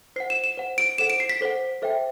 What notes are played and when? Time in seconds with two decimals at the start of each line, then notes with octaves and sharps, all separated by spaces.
0.16 C5 F#5 C7
0.30 E7
0.44 E7
0.57 C5 F#5
0.78 D7
0.98 A4 C5 F#5 E7
1.10 D7
1.20 C7
1.29 B6
1.41 A4 C5 F#5
1.82 A4 C5 E5 G5